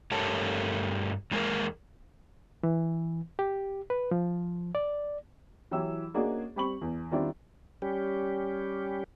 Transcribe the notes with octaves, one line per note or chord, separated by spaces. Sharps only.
G2 A3 G4 A#4 C#5 A5
E2 F#3 G#3 A#3 G#4 A#4
E3
G4
B4
F3
D5
E3 F#3 E4 G4 E6
A#3 C#4 D4 F#4 G#4 D#5
G3 C4 B5 C#6 F#7
E2
D#3 G3 C4 D4 E4 F4
G3 C#4 G4